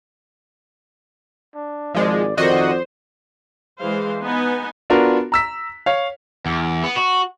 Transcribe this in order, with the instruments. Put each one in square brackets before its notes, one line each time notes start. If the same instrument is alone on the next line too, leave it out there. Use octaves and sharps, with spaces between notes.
[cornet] D4
[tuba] G#1 [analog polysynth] F3 G#3 [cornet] D5
[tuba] F2 [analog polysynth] D#3 F#4 D#5 [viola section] C5 [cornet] D5
[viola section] E3 G#3 G#4 C5 F5
B3 D#4 B4 D#5 G#5
[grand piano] B3 D4 F4 F#4 A#4
A#5 E6 B6
C#5 F5
[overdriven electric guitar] E2
B3
F#4